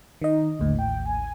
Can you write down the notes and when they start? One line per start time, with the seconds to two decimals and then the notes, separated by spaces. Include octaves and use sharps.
0.22 D#3 D#4 D#5
0.60 A1 D#2 A2 D3
0.79 G5
1.06 G#5